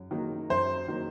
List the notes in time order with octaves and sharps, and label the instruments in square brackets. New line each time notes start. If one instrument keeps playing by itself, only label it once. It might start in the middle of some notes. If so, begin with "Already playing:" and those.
Already playing: [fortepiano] F#2
D#3 F#3 A#3
[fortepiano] F#2 [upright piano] C5
[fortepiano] D#3 F#3 A#3